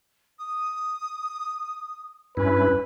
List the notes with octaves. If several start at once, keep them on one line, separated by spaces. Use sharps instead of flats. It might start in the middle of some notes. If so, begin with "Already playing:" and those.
D#6
G2 C#4 E4 B4